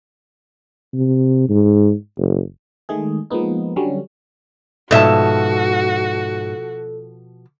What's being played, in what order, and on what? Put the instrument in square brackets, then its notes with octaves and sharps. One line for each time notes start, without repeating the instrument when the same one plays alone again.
[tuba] C3
G#2
F#1
[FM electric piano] D#3 G#3 A3 G#4
F3 G#3 A#3 B3 D#4
D3 F#3 G3 C#4
[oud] G#2 E5 [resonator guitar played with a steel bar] B2 F3 A5 [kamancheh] F#4 [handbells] A4